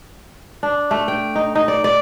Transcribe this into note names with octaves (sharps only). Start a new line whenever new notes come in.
D4
A3
G5
D#4
D#4
D5
D5